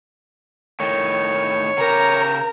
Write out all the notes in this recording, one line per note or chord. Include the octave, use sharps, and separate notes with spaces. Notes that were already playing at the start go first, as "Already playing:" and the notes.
A2 D#3 C#5
C#3 G4 A#4 A#5